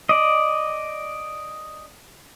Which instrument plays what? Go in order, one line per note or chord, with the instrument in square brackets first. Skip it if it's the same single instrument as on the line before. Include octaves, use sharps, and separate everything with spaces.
[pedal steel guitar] D5 D#5